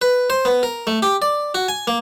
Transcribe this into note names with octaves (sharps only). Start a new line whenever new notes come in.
B4
C5
B3
A#4
A3
G4
D5
F#4
G#5
A#3